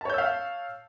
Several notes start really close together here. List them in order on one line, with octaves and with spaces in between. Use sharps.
A5 C#5 G6 E6 F5